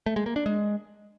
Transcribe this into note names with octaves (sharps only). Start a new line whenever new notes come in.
A3
G#3
A#3
D4
G#3